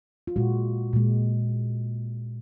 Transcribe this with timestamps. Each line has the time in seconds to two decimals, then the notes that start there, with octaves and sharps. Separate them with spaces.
0.27 F4
0.36 A#2 G#3 F#4
0.93 A#2 G#3